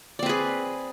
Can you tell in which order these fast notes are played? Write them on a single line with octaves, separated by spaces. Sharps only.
D5 C4 B4 G#4